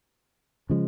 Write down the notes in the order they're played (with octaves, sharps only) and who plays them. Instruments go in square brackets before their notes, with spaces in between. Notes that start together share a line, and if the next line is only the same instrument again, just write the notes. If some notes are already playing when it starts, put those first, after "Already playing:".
[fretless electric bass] C#3 F3 G#3